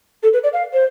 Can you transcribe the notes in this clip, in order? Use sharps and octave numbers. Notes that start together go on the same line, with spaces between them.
A4
B4
D5
F5
C5